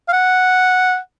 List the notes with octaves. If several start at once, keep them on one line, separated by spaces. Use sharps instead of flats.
F5
F#5